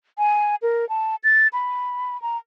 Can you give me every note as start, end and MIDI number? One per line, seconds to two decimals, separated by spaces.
0.18 0.55 80
0.62 0.88 70
0.89 1.16 81
1.24 1.48 93
1.53 2.20 83
2.22 2.37 82